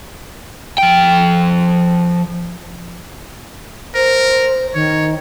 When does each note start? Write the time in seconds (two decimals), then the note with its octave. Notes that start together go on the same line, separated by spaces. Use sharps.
0.78 F3 G5
3.95 A#4 C5
4.74 D#3 C#5